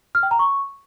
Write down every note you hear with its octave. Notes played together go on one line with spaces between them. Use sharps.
F6
G5
A#5
C#6